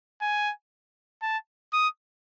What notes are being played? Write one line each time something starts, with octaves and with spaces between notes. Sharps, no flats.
G#5
A5
D#6